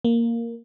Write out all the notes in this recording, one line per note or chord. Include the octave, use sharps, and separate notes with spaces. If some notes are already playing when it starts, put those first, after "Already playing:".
A#3